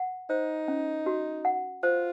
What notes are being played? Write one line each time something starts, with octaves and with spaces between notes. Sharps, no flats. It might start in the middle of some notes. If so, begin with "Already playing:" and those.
Already playing: F#5
D#4 C5
C#4
F#4
F#5
F4 C5